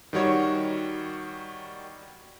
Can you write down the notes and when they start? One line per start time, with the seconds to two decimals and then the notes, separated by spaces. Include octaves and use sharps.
0.13 D#3 G3 F#4 C#5